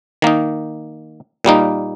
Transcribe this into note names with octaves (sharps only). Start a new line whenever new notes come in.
D#3 A#3 D#4
A#2 G3 A#3 D#4